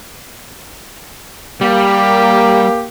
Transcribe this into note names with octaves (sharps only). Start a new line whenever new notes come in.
G3 A#3 G4